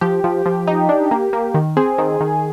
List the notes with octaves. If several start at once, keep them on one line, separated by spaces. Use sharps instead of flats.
F3 G4
F3
F3
D#4
D4
A#3
A#3
D#3
C4 G#4
D#3
D#3